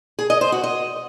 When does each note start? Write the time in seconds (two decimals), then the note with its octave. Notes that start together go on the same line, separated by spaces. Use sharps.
0.19 G#4
0.30 D#5
0.41 C5
0.52 F#4
0.64 D#5